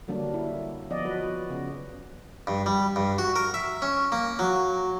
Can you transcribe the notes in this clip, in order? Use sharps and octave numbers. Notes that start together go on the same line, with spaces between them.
D3 F#3 G3 A#3 D4
E4
F3 B3 D5 D#5
F#3 F#4 B4
C#3 B3
G2
G3
G2
F#4
A#4
E5
C#4
A#3
F#3